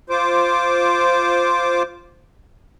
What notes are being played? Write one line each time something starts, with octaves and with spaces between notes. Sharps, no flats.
F4 C5 D6